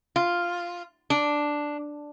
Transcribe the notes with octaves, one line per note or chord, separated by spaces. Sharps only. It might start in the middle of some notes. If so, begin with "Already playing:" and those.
F4
D4